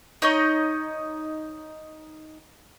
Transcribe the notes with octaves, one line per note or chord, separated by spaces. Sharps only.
D#4 C#5 D#5